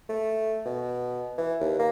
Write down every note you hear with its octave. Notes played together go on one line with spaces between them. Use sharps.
A3
B2
E3
D#2
A#3